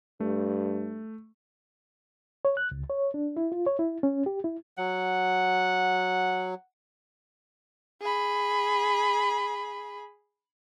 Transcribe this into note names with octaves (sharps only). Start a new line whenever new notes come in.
G2 A3
C#5
F#6
C#2
C#5
D4
E4
F4
C#5
E4
C#4
G4
E4
F#3 F#5
G#4 B5